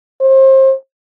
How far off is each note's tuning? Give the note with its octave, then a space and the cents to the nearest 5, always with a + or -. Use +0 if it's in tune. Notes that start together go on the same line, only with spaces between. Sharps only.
C5 +30